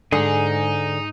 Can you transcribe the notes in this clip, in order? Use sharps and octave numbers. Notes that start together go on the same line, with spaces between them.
G#2 D3 D#4 G#4